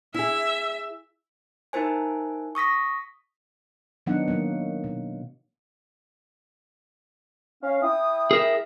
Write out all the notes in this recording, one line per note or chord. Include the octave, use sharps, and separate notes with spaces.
E4 G#4 E5
D#4 E4 A#4 C5 G#5
C#6 D#6 A#6 B6
D#3 F#3 B3 D4 D#4 F#5
D#3 F#3 A#3
B2
C#4 F5
E4 G5 D#6
G#4 A#4 E5